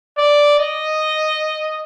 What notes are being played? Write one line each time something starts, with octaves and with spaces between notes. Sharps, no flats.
D5
D#5